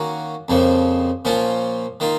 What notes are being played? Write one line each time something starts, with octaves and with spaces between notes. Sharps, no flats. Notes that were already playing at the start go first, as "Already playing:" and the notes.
Already playing: D#3 A#3 C#4 F#4
F2 C#3 F3 A#3
A#2 F3 A#3 C#4 F4
D#3 A#3 F4